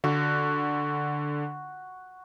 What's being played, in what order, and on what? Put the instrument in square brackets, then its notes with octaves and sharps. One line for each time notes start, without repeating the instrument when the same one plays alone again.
[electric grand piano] D3 [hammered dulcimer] F#4